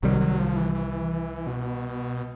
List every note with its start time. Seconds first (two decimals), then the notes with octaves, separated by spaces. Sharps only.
0.02 C2 C3 D#3 F#3 G3
0.21 F#3
0.39 F3
0.56 E3
0.75 E3
1.47 B2